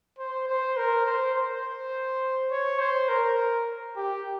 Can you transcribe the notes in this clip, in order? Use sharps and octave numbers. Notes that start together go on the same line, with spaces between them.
C5
C5
A#4
C5
C5
C#5
C5
A#4
G4